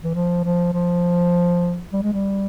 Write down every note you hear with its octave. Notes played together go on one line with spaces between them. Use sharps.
E3
F3
F3
F3
G3
G#3
G3